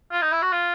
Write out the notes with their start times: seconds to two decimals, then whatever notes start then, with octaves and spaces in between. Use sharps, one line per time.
0.12 F4
0.22 D#4
0.32 E4
0.42 F#4
0.52 F4